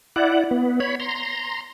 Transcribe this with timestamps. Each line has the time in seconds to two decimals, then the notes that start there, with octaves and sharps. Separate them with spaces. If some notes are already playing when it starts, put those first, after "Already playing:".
0.16 E4 D5 F#5
0.51 B3
0.80 C#5 B5
1.00 A#5 C6